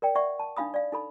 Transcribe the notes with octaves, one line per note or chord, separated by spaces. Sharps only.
A#4 D5 G5
D5 E5 F#5 C#6
A5
D4 D#4 F5 B5 D#6
D5 F5
D#4 A4 B5